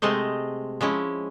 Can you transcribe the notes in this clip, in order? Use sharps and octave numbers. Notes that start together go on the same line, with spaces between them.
C3 G#3 A3 C5 D#5
F3 G#3 C#4 E4